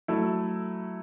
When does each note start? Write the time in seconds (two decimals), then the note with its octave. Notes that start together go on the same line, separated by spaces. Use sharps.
0.08 F#3 A3 E4